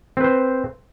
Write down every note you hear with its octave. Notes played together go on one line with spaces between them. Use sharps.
C4 B4 C5